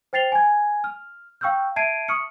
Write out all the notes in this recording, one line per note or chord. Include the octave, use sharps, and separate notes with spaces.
C5 G5 A6 C7 F7 G7
G#5 G#6
F6
F5 G5 C#6 E6 F6 G6
E5 A5 G#6 C7 D7 D#7
C#6 D#6 F6 C#7